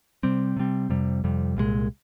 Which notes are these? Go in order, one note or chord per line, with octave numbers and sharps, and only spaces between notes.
C3 G3 C4
C3 G3 C4
F2 C3 G3
F2 C3 G3
C2 A#2 F3 G#3